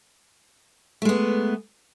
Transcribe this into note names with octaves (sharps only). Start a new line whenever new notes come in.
G#3 A3 B3